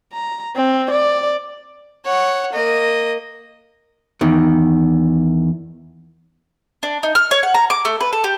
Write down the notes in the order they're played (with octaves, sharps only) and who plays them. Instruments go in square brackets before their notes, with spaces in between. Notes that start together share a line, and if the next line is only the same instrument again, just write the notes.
[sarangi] A#5
C4
D5
[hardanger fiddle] C#5 F#5
A#3 D#5
[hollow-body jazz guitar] E2 D#3
[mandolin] D4
D#4
F6
C#5
F#5
A#5
D6
A3
B4
A4
G4